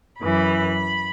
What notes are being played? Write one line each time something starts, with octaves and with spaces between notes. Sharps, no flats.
F#2 E3 B5